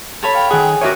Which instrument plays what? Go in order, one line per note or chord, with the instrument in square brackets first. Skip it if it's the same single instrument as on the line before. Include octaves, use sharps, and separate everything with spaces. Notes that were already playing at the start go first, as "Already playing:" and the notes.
[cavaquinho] A4 C#5 B5
[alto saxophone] F5 [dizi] G5
[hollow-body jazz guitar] D#3 F#5 [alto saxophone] G#4
[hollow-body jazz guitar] F#4 A#4 C#5 [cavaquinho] D#5 D6 [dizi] E5